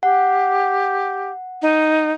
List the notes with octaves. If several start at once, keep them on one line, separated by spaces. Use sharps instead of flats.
G4 F#5
D#4